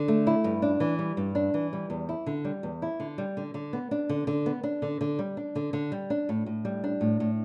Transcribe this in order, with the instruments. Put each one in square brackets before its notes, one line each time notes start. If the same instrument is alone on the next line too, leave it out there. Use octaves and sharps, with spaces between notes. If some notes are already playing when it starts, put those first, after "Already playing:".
Already playing: [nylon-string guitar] D3
A3
E4
G2
D4
E3
G3
G2
D4
E3
G3
E2
E4
D3
G3
E2
E4
D3
G3
D3
D3
B3
D4
D3
D3
B3
D4
D3
D3
G3
D4
D3
D3
G3
D4
A2
A2
G3
D4
A2
A2